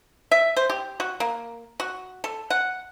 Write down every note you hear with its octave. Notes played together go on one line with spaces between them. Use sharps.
E5
C5
G4
F#4
A#3
F#4
A4
F#5